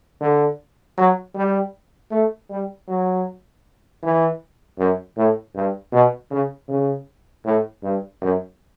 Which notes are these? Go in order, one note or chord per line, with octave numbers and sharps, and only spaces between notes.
D3
F#3
G3
A3
G3
F#3
E3
F#2
A2
G2
B2
C#3
C#3
A2
G2
F#2